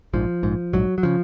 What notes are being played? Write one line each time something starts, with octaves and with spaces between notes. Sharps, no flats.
A#1 G#2 F3
A#1 G#2
A#1 G#2 F#3
F#3
C#3 F3